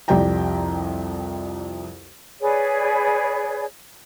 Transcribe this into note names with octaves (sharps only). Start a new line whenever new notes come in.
C2 F2 G4 D5 G5 A#5
G#4 B4 C#5 D5